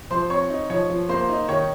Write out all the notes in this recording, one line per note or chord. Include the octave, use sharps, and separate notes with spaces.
F3 C5 C6
C4 C#5 C#6
D#4
F3 C#5 C#6
F3
A#3 C5 C6
D#4
D#3 C#5 C#6